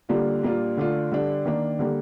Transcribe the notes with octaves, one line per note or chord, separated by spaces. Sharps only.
D3 G3 A#3 D4 F4
A#2 G3 A#3 D4 F4
D3 A3 D4 F4
D3 G3 D4
D#3 A#3 D4
D3 G3 A#3